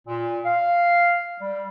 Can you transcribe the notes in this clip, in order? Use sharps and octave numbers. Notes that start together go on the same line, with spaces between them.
A#2
F5
G3